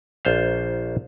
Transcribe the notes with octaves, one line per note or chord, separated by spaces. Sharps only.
A#1 F4 C5 F5